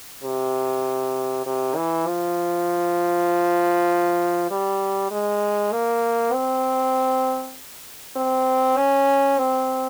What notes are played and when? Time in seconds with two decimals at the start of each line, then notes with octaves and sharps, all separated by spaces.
0.24 C3
1.46 C3
1.76 E3
2.07 F3
4.51 G3
5.11 G#3
5.72 A#3
6.33 C4
8.16 C4
8.77 C#4
9.39 C4